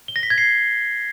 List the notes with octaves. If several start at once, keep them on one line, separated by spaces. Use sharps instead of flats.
G7
A#6
B6
G#6
C7